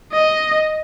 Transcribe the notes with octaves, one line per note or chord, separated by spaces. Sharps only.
D#5